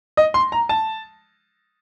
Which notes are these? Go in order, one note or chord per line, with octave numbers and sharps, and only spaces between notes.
D#5
C6
A#5
A5